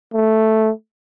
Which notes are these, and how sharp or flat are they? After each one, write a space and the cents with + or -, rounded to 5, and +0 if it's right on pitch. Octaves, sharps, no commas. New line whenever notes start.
A3 +0